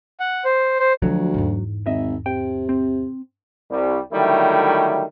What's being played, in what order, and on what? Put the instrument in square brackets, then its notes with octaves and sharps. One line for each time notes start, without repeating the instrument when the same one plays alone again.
[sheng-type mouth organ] F#5
C5
C5
[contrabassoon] D2 [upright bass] D3 F3 [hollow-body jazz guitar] F#3
[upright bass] E2 G#2
[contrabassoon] G#1 [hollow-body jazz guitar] D#5 E5
[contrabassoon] C3 [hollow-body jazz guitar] G5
[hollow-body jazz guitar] C4
[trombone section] C2 G3
D3 D#3 F#3 G3 A3 E4